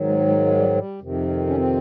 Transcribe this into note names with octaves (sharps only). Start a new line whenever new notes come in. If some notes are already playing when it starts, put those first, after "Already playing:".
Already playing: G#2 D#3 F#3
G#3
G#3
G#3
G3
G3
F2 C3 D#3
C#4
C4